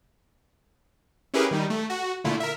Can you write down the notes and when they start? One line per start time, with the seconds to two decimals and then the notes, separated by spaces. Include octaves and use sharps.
1.34 C#4 E4 G4 G#4 A#4 B4
1.51 D#3 G3 D#4
1.70 A3
1.90 F#4
2.24 A#2 D3 A3 E4 F4
2.40 A#4 E5